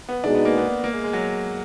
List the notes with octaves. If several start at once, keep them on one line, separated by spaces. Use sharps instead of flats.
B3
B2 G#3 D4 D#4 G#4
B3
A#3
B3
A#3
G#3
G#3
F#3